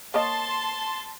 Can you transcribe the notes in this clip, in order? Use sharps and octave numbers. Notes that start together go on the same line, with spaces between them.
A#3 C#5 D#5 A5 C6